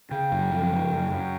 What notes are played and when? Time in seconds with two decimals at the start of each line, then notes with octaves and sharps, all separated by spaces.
0.11 C#3 G5
0.32 F#2
0.51 F3
0.72 C#3
0.92 F#2
1.12 F#2